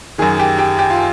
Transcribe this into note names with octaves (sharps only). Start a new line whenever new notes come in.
F#2 D#3 G#4
G4
G4
G4
F4